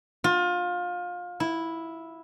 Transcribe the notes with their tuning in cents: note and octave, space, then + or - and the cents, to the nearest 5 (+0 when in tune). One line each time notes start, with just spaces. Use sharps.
F4 +25
E4 -5